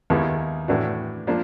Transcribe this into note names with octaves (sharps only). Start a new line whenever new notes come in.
D#2 D#3 G#3 B3 E4
A2 E3 A3 D4 F#4
F3 A#3 D4